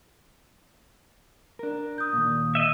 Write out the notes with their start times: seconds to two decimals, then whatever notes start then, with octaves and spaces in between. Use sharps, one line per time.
1.59 D4 A#4
1.98 D#6 G6
2.13 D#2 A#2
2.55 D#5 E5